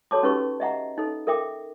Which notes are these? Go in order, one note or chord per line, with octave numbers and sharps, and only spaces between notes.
F#4 A4 C#5 A5 D6
C#4 D#4 G4 B4 C#6
D#5 E5 F#5 A#5
D#4 A4
A4 A#4 E5 G5 D6